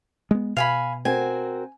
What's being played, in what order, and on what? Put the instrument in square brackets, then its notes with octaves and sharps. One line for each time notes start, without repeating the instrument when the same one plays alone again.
[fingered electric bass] G#3 B3
[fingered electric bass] B2 [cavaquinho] F5 G#5 B5
[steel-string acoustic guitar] C4 F#4 A#4 [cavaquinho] G#5